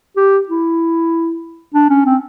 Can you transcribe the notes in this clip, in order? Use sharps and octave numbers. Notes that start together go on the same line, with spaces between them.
G4
E4
D4
C#4
C4